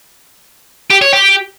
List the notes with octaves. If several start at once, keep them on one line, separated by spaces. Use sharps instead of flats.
G4
C#5
G4